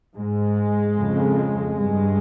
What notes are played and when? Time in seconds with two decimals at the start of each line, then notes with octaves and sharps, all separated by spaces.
0.17 G#2 G#3
0.98 F2 C#3
1.79 G2 G#3